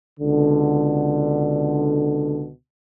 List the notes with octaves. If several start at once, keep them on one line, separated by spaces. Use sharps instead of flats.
C#2 B2 D3